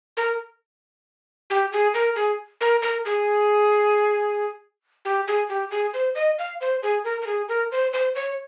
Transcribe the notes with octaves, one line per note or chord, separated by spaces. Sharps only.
A#4
G4
G#4
A#4
G#4
A#4
A#4
G#4
G4
G#4
G4
G#4
C5
D#5
F5
C5
G#4
A#4
A#4
G#4
A#4
C5
C5
C#5